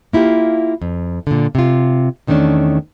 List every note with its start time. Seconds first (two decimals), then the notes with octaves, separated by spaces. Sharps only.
0.13 A#3 E4 F4 G4
0.82 F2
1.27 A#2 D3
1.55 C3 F4
2.27 E2 D#3 A3 C#4 D4